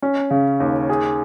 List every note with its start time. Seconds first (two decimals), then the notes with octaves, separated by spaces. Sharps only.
0.02 C#4
0.30 C#3
0.60 D#2
0.89 G#4